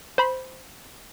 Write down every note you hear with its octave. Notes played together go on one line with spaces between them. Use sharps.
C5 B5